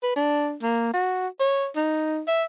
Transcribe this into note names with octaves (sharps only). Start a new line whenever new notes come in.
B4
D4
A#3
F#4
C#5
D#4
E5